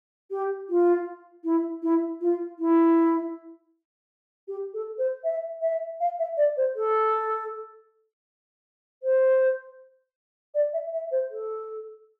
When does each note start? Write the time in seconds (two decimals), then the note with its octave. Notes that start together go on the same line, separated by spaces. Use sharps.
0.31 G4
0.69 F4
1.44 E4
1.83 E4
2.21 F4
2.59 E4
4.48 G4
4.74 A4
4.98 C5
5.24 E5
5.62 E5
6.00 F5
6.19 E5
6.37 D5
6.57 C5
6.76 A4
9.03 C5
10.54 D5
10.73 E5
10.93 E5
11.11 C5
11.31 A4